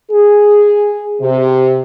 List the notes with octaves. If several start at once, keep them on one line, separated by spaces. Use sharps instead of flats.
G#4
C3